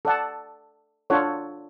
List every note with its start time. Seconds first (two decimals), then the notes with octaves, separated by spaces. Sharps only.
0.05 A4 D5 F#5 A5
1.10 D4 F4 A4 C#5 F#5